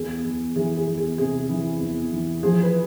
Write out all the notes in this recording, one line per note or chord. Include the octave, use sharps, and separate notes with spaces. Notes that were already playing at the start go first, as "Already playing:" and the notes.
Already playing: E2 G#4
E2
E3 G#4
G#4
E2
G#4
C3 G#4
E3
E2
E3
F3 G#4
B4